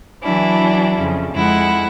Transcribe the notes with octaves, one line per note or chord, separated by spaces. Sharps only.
E3 F#3 D4 E4
F2 C#3
F2 G#3 E4 F#5